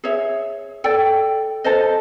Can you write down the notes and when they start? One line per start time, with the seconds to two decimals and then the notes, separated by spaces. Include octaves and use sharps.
0.04 G#4 C#5 E5
0.84 A4 D5 G5
1.64 A4 C5 D#5